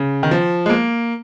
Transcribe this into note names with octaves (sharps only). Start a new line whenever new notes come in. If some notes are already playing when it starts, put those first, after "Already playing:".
Already playing: C#3
D#3
F3
G#3
A#3